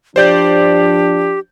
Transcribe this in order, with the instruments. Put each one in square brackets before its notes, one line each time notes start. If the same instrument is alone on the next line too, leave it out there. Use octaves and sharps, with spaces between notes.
[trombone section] F3 D4 [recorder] G4 [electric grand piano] C5 D5 G6